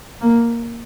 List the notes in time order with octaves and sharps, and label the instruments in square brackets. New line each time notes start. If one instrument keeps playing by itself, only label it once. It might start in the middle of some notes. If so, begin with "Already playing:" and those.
[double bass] A#3